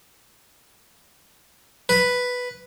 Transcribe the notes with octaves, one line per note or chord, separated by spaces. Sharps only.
B4